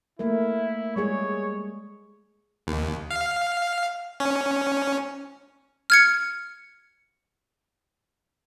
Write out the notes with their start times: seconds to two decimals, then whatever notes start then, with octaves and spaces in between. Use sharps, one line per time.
0.19 A3 A#3 E4 A#4
0.96 G3 G#3 G#4 C#5
2.67 D#2
3.11 F5
4.20 C#4
5.90 F6 G#6 C#7